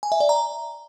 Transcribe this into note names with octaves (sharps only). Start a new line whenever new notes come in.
G#5
E5
D5
A#5